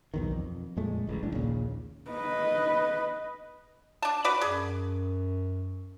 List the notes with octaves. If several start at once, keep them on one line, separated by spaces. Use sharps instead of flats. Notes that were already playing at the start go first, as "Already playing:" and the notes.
B1 E2 D#3
F2
F2 A#2 G#3 A3
D1 A1 G#3
F#1 A2 D4
A#1 D#2 A#2 C#3
B4 D#5
D4 A5
F#4 B4 D5
F#2 G#4